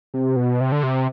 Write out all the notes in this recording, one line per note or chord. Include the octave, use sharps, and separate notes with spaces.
C3
B2
C3
D3
C3